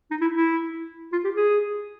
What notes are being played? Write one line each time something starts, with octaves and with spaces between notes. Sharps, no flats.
D#4
E4
E4
F4
G4
G#4